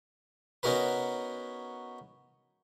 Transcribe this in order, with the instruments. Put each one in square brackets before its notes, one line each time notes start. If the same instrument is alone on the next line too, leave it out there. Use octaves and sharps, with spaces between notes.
[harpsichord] B3 C#4 D#4 F#4 A#4 B4